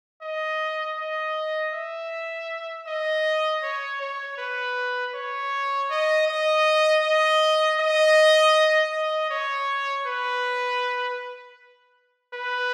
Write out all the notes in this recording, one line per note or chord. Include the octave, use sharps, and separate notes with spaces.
D#5
D#5
E5
D#5
C#5
C#5
B4
C#5
D#5
D#5
D#5
D#5
D#5
C#5
B4
B4